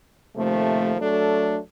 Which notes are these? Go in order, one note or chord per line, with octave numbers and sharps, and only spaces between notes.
D#2 C3 F3 A3
F#3 A3 D4 A4